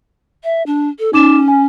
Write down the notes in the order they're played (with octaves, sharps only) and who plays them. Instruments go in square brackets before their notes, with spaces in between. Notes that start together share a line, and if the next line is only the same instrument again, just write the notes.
[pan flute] E5
D4
A4
[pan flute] C#4 [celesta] D#4 D6 E7
[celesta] G#5